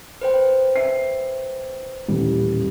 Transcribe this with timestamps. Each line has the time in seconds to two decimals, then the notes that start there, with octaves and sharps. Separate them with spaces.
0.21 B4 C5 G5
0.76 E5 C7
2.08 D#1 A1 G3